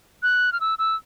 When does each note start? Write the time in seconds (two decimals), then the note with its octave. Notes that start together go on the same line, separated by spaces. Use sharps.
0.23 F#6
0.53 F6
0.61 E6
0.79 E6